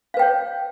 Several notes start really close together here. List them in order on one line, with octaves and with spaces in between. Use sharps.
F5 B4 G5 C#5